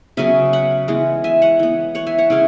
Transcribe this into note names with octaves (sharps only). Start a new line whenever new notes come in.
C#3 F#3 B3 E5 G#5
F#5 B5
E3 G#3 B3
E5 G#5
C#5 F#5
E3 B3
C#5 F#5
E5 G#5
C#5 F#5
C#3 G#3 C#4 E4